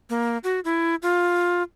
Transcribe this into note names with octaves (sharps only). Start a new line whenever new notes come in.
A#3
F#4
E4
F4